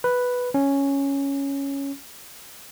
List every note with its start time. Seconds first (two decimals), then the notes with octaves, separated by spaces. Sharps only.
0.04 B4
0.54 C#4